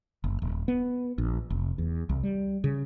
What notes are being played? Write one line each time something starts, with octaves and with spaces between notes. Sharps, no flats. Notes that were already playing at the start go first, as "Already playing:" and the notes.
F#1
D#1
B3
A#1
F1
E2
C2
G3
C#3